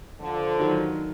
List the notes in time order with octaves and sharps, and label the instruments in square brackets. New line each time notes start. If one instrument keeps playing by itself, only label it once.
[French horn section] D3 F3
[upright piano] D#3 F#3